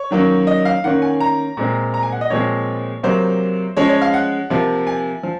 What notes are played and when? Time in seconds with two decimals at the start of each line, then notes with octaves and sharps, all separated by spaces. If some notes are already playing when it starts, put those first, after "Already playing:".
Already playing: C#5
0.11 D#3 F#3 A#3 C#4
0.47 D#5
0.65 F5
0.84 D#3 A#3 C#4 F#5
1.02 G#5
1.20 A#5
1.57 A#2 G#3 C4
1.94 A#5
2.03 G#5
2.12 F#5
2.21 D#5
2.30 A#2 F3 G#3 C4 C#5
3.03 C3 F#3 A#3 C5
3.77 F3 G#3 C#4 C#5
3.89 C#5
4.02 F5
4.14 F#5
4.50 C3 F3 A#3
4.87 G#5
5.23 F3